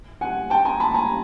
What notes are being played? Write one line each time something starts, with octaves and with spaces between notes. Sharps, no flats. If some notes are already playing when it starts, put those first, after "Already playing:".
F#5 G#5
G5 A5
G#5 A#5
A5 B5
G#5 A#5